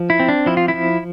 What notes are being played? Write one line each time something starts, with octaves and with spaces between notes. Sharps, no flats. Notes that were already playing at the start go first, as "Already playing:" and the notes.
Already playing: F3
E4
C4
D4
F3 E4
F4
E4
F3